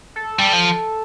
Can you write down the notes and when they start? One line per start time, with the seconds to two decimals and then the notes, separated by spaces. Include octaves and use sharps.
0.16 A4
0.39 G3
0.53 F3